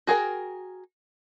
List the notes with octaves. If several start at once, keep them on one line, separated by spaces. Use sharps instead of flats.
F#4 G#4 A#4 G5